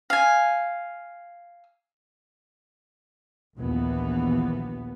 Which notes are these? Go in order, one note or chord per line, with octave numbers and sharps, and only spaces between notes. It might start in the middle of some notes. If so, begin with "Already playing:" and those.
F5 G#5
A#1 D#2 E3 B3